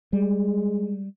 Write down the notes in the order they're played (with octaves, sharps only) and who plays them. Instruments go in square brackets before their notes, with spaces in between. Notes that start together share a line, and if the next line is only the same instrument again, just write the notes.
[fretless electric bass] G3 [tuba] G#3